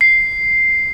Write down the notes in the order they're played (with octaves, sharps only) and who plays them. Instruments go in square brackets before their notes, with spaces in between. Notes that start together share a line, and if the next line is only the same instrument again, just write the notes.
[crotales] C7